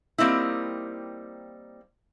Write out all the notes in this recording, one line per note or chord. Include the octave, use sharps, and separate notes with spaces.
G3 A#3 C4 D#4 E4